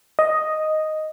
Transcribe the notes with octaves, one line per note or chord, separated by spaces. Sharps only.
D#5